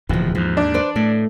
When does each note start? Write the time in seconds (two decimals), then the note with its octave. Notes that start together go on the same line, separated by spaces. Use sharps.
0.09 D1 D#2 B2 E3 F3
0.35 D#2 G#2 F3
0.57 D4
0.74 B4 C5 D5
0.96 A2 A3 D5